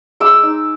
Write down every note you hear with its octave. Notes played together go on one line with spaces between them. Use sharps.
G#3 D6 E6
D#4